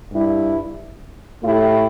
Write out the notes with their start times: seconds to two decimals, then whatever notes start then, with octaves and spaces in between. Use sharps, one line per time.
0.12 G2 G3 E4
1.43 A2 A3 E4 G4